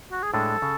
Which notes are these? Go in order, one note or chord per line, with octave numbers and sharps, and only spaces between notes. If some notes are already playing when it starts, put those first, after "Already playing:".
F#4
G#4
A2 G#3 D4 A4
C#3